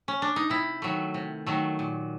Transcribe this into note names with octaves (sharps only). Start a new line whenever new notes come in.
C#4
D4
D#4
C3 E4
D#3 F#3 A3
C3
D#3 F#3 A3
A#2